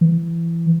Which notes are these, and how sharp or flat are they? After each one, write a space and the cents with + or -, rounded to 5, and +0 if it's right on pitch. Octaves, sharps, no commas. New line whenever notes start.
E3 +25